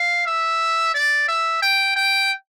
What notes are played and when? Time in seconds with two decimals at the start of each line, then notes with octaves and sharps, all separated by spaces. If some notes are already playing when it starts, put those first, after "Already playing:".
Already playing: F5
0.27 E5
0.94 D5
1.28 E5
1.62 G5
1.96 G5